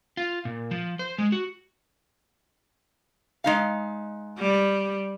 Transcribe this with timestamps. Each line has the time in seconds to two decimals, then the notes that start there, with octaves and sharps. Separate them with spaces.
0.17 F4
0.45 A#2
0.71 F3
0.99 C5
1.18 G#3
1.32 F#4
3.44 G#3 D#4 F5
4.38 G3